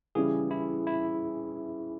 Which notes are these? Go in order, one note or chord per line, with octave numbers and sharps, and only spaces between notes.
C#3 E3 G3 C#4 G#4
E4
E4